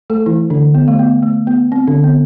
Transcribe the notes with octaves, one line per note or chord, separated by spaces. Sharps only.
A3 A4
E3 E4
D3 D4
B3
A3
B3
A3
B3
C4
D3 D4
B3